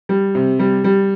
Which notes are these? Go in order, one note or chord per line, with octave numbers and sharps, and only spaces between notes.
G3
C3
G3
G3